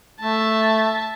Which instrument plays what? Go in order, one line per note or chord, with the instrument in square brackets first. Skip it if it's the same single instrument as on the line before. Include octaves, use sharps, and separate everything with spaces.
[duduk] A3 [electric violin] E5 A5